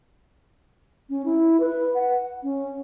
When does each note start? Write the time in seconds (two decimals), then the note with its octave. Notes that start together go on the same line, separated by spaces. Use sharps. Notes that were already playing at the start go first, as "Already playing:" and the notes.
1.10 C#4
1.25 E4
1.60 B4
1.95 F#5
2.43 C#4